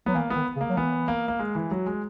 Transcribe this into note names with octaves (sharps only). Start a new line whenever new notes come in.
F#3 B3
E3 A#3
B3
D#3
C#3
A#3
F#3
E3 B3
A#3
A#3
G#3
E3
F#3
G#3